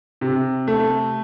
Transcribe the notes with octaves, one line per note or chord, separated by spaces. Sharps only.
C3
A3